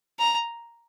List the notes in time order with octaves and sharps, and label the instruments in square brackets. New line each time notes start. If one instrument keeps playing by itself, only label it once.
[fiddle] A#5